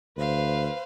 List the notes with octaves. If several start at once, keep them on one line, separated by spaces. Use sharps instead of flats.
D2 B4 C5 F5